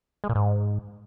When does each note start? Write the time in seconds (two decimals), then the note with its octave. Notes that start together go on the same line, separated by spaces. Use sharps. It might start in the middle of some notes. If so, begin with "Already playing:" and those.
0.24 G#3
0.29 A#2
0.35 G#2